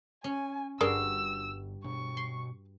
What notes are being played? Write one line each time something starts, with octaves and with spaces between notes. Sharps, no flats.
C#4 G#5
G1 G2 F#4 G#4 A#4 D5 C6 E6
B2 D4 C#6
C6